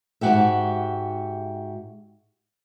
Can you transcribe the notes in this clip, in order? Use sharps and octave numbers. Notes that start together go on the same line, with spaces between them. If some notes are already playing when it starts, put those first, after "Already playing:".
G#2 D#3 F#4 G4 E5